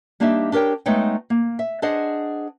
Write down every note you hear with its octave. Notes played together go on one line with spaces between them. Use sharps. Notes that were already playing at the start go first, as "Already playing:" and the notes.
G3 A#3 D4 D#4 G4 E5
D4 G4 A#4 C#5 G5
G#3 A3 B3 D#4 C#5 G5
A#3
E5
D4 G#4 C5 D#5 F#5